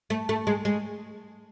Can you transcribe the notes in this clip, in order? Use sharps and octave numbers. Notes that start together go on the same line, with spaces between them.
A3
A3
G#3
G#3